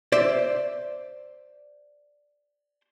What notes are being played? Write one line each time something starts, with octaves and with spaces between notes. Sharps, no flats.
C5 D5 E5